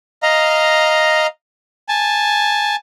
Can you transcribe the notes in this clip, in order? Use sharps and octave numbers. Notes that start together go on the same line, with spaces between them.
D#5 F5 A#5
G#5 A5